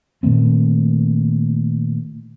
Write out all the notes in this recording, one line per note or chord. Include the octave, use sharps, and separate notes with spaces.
A#2 D#3 A3 C4